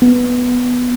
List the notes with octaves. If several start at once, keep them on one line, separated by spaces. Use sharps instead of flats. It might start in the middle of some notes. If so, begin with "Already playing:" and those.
B3